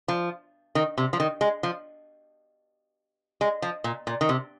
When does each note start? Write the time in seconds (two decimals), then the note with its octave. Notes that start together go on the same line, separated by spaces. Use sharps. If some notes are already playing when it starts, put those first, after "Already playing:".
0.08 F3
0.75 D#3
0.98 C3
1.13 F3
1.20 D#3
1.41 G#3
1.63 F3
3.41 G#3
3.62 F3
3.84 A#2
4.07 A#2
4.21 D#3
4.29 C3